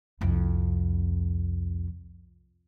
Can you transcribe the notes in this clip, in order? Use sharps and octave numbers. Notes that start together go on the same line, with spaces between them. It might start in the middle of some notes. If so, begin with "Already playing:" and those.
C2 F2